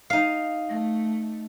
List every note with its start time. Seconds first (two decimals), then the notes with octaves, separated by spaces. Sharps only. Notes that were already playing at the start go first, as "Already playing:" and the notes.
0.10 D#4 F5
0.69 A3